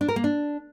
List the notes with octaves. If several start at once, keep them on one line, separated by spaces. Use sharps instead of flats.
D4
A#4
A#3
D4